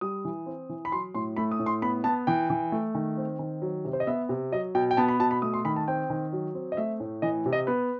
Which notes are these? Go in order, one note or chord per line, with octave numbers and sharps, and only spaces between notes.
G3 D#6
E3
C4
E3
B5
F#3 C6
A2 C6
A3 B5
D#6
A2
C6
B3 B5
B3 A5
E3 G5
E3
A3
D#3
C4
D#3
F#3
C3
C5
D#5
B3 E5
C3
F#3 D#5
B2 G5
G5
B3 A5
B5
B2 A5
B5
A3 D#6
C6
D#3 B5
A5
C4 G5
D#3
F#3
C4
D#5
A3 E5
A2
E3 D#5
C3
D#5
B3 B4